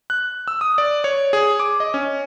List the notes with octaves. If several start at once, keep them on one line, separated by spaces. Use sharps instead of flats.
F#6
E6
D#6
D5
C#5
G#4
D6
D#5
C#4